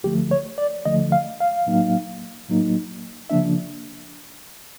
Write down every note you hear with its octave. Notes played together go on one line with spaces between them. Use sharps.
D2 D3 F3 A3 G4
C#5
D5
D2 D3 F3 A3 D#5
F5
F5
A2 F#3 A#3 D#4
A2 F#3 A#3 D#4
C#3 F3 A#3 D4 E5